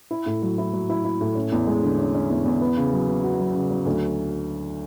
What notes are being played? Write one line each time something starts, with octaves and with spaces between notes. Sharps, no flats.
E4
A2
F#3
E4
F#3
E4
E4
A2
C#4
E2
G#3
D3
C#4
C#4
E2
E2
B3
C#3
F#3
B3
F#4
F#3
C#3
F#3
D2